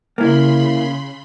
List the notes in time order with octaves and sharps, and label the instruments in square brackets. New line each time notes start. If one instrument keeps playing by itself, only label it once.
[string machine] C#3 B5 C6 [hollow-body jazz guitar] A#3 E4